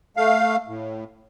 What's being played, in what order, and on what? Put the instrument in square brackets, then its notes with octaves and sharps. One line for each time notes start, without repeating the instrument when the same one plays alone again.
[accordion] A3 F5
A2